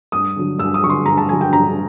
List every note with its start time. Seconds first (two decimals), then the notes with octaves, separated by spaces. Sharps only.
0.12 G2 D#6
0.36 D3 F#3
0.59 G2 E6
0.74 D#6
0.83 F#3 C#6
0.86 D3 C6
1.05 G2 A#5
1.18 A5
1.29 D3 F#3 G#5
1.41 G5
1.53 G2 A#5